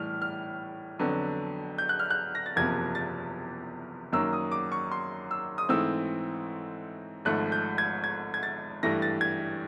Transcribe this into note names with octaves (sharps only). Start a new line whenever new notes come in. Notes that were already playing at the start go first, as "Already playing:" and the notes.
Already playing: A2 E3 G3 F6
F6
F2 D3 F#3 B3
G6
F#6
F6
F#6
A#6
A6
F#1 E2 C3 F3 A#3 G#6
A6
F#2 D#3 F#3 A#3 E6
D#6
D6
C#6
C6
E6
D#6
G#2 E3 A3 C4 E6
G#1 G#2 F3 A3 F#6
G6
G#6
G#6
G#6
A6
G2 E3 A3 A#6
A6
G#6